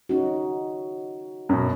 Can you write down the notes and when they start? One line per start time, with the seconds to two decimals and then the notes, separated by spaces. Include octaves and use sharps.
0.09 C#4 D#4 F#4
1.49 F#2 B2